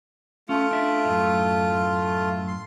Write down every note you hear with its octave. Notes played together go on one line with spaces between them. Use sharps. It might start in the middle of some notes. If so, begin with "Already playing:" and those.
A3 C#4 F4
D4 E5
F#2 A2
C6